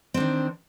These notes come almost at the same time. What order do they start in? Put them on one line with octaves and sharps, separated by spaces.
C4 D4 D#3